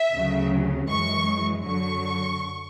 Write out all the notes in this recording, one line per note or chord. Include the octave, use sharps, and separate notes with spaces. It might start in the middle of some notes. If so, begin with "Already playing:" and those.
Already playing: E5
D2 C#3 F#3
F#2 E3 G#3 C#6
F#2 D3 F#3 C#6